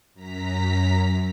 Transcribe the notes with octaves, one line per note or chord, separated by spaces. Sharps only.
F#2 A#5 B6